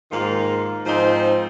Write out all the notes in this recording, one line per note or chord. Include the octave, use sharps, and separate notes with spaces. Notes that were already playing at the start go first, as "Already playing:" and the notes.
G#2 D#3 A#3 F4
G#2 F3 C4 D#4